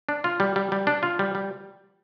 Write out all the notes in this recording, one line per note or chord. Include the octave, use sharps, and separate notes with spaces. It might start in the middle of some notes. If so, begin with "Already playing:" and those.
D4
F4
G3
G3
G3
D4
F4
G3
G3